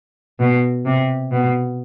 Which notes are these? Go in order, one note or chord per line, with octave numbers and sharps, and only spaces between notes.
B2
C3
B2